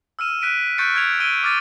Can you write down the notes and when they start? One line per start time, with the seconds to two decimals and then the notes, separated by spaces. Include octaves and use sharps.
0.19 E6 F6 D#7 E7
0.42 F#6 B6 D7 D#7
0.78 C#6 F#6 G6 A6 C#7 D7
0.95 F6 G#6 D7 F7
1.20 E6 D7 D#7 G7
1.43 D6 F6 A6 D#7